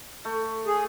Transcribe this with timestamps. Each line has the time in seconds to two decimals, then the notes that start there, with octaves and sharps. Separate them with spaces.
0.25 A3
0.67 G#4